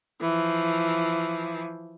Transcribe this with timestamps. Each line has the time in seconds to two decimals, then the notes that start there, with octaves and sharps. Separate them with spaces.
0.22 E3 F3